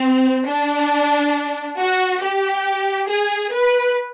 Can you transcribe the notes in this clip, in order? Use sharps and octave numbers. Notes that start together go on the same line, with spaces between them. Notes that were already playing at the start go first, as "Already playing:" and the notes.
Already playing: C4
D4
F#4
G4
G#4
B4